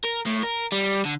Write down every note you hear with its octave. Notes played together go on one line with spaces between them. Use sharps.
A#4
A2
A#4
G3
D3